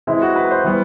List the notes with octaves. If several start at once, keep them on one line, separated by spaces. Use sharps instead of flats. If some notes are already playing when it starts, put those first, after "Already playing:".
E3 G#3 C4 E4
F#4
B4
C5
E3 G3 B3